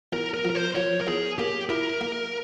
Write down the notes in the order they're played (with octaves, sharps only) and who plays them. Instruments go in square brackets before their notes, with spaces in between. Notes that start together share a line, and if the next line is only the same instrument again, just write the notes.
[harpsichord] E2 [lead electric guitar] A#4
[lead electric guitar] A#4
[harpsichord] F3
[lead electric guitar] A#4
C5
[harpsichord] F3 [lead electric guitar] C#5
[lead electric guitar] A#4
[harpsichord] E2 [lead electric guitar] G#4
[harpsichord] A#3 [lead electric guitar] G4
[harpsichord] E4 [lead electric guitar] A#4
[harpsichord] A#3